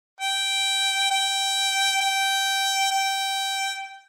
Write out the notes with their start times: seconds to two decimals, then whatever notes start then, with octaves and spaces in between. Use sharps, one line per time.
0.21 G5
1.11 G5
2.01 G5
2.91 G5